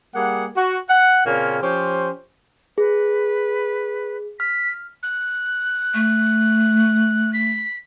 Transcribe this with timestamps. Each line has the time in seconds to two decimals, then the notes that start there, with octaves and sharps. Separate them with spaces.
0.15 G3 A#3 G#4 F#5
0.57 F#4
0.90 F#5
1.26 A#2 C#3 A#3 C4 C#4
1.62 F3 C#4 G4 C5
2.78 G#4 B4
4.40 F6 B6
5.03 F#6
5.94 A3
7.33 B6